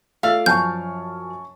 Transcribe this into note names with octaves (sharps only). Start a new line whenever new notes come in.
A3 F4 D5 E5 F5 E6
F#2 F3 G#5 A5 C#6 F6 G6